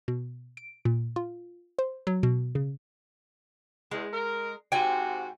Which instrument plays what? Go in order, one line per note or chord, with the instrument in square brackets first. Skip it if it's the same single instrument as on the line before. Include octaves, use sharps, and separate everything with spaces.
[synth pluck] B2
D7
A#2
F4
C5
F#3
B2
C#3
[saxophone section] E2 [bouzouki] G#3
[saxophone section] A#4
[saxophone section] G#2 C3 F#4 [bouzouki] G5 G#5